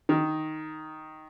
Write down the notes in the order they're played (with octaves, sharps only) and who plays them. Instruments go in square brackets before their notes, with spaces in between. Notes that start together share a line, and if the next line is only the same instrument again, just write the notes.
[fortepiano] D#3